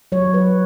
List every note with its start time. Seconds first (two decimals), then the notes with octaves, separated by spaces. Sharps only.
0.12 F#3 C#5
0.34 B4